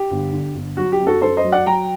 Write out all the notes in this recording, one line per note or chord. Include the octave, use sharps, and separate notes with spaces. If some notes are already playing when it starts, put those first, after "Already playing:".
Already playing: G4
G1
D3
G1
F#3 F#4
G4
F#2
F#4 A4
F#2 A4 C5
C5 D#5
F#3
D5 F#5
F#3 G5 A#5